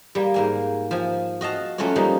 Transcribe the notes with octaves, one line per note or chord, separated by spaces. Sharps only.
G3 A#3
G#2 A#3 G#5
F3 G#5
F#4 D#5 F5 A5
F#3 A3 C#4 F4 F#4 C#5
F3 G3 A#3 D#4